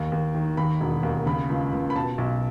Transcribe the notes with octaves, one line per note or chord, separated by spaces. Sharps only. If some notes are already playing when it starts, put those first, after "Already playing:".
Already playing: D#2
D#2
D#3
D#2 B5
E1
D#2
C#3 B5
C#2
C#2
B5
B2 A5
B1